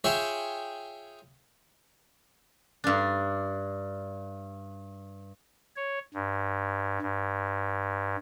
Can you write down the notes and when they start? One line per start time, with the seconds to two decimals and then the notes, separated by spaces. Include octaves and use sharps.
0.04 F4 G#4 C#5 E5 G5
2.84 G2 D4
5.76 C#5
6.14 G2
7.02 G2